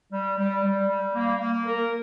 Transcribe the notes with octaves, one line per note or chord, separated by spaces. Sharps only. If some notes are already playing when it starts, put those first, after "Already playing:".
G3
G3
G3
G3
A#3
A#3
A#4